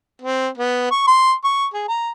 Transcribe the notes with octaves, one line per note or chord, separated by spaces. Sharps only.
C4
B3
C#6
C6
C#6
G#4
A#5